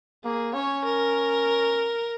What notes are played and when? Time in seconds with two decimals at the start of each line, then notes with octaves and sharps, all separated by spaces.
0.25 A#3 G#4
0.54 C#4 C#5
0.85 A#4